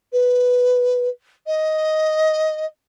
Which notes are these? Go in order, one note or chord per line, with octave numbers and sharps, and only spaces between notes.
B4
D#5